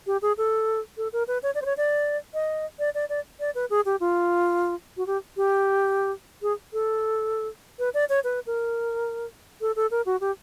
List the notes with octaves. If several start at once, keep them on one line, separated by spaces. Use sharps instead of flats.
G4
G#4
A4
A4
A#4
B4
C#5
D5
C5
C#5
D5
D#5
D5
D5
D5
D5
B4
G#4
G4
F4
F#4
G4
G4
G#4
A4
B4
D5
C#5
B4
A#4
A4
A4
A#4
F#4
G4